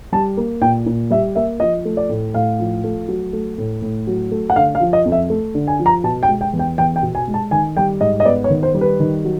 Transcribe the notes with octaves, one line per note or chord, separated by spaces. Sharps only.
G3 A5
A#3
A#2 G5
A#2
G3 E5
A#3 E5
F3 D#5
A3
D5
A2
A2 F5
F3
A3
F#3
A3
A2
A2
F#3
A3
F#5
D3 F5
F5
F3
D#5
F2
E5
A3
D3
G#5
F3
A#5
B2 A5
G5
G#3
G5
E2
G5
E2 G5
G5
B2
G#5
G#3
A5
D#3 G#5
G3 G5
G#2 D#5
D#5
B3 D5
C#5
D#3
C5
G3
B4
D#3
F#3